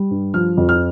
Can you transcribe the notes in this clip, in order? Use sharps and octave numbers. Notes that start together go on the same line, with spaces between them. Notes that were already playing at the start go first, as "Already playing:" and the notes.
Already playing: G3
G2
F3 F6
F2
F6